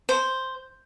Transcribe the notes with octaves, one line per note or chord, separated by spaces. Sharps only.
C5